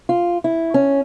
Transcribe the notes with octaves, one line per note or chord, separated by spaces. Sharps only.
F4
E4
C#4